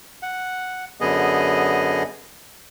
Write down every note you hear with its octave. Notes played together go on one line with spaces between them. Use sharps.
F#5
F#2 D3 B3 G#4 D#5